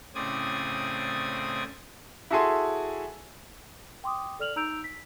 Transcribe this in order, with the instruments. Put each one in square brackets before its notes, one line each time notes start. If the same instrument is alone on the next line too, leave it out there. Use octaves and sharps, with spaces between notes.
[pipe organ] A2 C#3 C4 D5 D#6 G#6
[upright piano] E4 F#4 G#4 A4 G#5 C6
[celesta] G5 C6 D6 D#6
A4 D5 F6 F7 F#7
D#4 A#5 E6 G6 D7 F7
B6